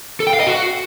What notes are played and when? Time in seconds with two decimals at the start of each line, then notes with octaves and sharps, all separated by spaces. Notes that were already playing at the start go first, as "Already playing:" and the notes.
0.20 A4
0.27 G5
0.33 F5
0.40 D#5
0.47 F#4